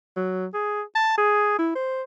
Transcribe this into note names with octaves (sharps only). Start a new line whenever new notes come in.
F#3
G#4
A5
G#4
E4
C5